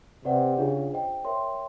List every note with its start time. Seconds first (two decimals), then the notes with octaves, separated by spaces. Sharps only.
0.25 C3 G4 B4 D5 F#5
0.58 C#3 D4 F4 G#4
0.92 C5 D#5 G5
1.24 A#4 C#5 E5 G5 C6